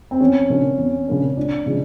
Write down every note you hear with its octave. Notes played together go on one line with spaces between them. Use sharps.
C4
E2 C#4
C#3 F3 A#3 D4
E2
C#3 F3 A#3 D4
C#2 D4
C#3 F3 G#3